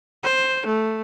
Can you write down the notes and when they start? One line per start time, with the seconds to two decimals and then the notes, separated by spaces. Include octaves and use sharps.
0.23 C5
0.66 A3